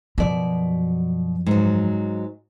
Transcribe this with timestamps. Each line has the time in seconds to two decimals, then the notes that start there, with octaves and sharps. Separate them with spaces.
0.18 F#2 B2 F3 D5
1.46 G#2 F#3